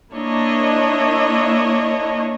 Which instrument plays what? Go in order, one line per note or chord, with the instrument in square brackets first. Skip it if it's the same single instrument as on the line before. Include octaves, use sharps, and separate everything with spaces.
[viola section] A#3 D4 E4 C#5 D#5